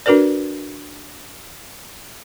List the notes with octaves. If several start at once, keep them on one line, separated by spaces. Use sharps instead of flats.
D4 F#4 A#4 B4 D5